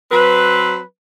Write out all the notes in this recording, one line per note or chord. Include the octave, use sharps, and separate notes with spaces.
F#3 C4 B4